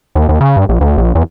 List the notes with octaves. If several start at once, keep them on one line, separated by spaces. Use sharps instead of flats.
D#2
D#2
C#3
G2
A#1
D2
A#1
E2